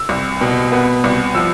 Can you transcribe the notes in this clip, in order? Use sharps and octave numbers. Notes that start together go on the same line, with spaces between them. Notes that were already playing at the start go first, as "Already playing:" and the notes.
Already playing: E6
C2
B2
B3
C2
F3 E6